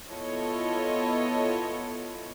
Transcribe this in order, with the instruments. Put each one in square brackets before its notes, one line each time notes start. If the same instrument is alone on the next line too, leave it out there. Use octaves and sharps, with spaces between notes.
[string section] B3 E4 F4 A4 C#5 D#5